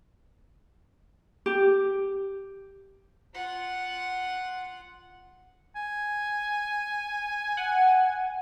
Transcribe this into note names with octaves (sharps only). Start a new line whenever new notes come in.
G4
F4 F#5
G#5
F#5